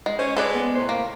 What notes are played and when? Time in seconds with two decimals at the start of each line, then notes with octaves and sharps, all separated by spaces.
0.06 G#3
0.19 C#4 C5 C#5
0.36 G#3 A4 B4 D5
0.54 B3
0.75 A2 C3 C5
0.89 A#3